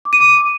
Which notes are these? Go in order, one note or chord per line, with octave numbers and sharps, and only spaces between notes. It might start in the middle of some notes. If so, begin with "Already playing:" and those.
D6
D#7
D6